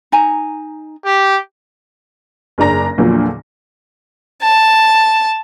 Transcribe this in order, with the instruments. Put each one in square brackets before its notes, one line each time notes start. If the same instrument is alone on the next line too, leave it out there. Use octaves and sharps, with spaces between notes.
[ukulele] D#4 G#5 A#5
[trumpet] G4
[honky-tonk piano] F#1 C#3 D4 A#5 A#6
E2 A#2 D3 F3 F#3 A#3
[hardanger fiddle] A5